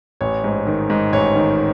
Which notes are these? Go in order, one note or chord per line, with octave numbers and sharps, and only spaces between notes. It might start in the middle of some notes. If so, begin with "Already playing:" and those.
A1 C#5
G#2
D#3
G#2
A1 C#5
D#3